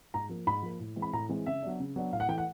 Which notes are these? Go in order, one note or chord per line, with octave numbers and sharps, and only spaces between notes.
G#2 A#5
F3 A#3
G#2 B5
F3 A#3
A2
E3 G#3 C4
B5
A2 A#5
E3 G#3 C4
C#3 E5
F#3 B3 D4
C#3
F#3 B3 D4
A2 F5
F#5
E3 A3 G5
F#5